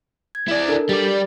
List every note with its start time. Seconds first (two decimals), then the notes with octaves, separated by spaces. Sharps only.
0.35 G#6
0.48 E4 D5
0.68 D4 A4 A#4
0.89 G3 D5 A6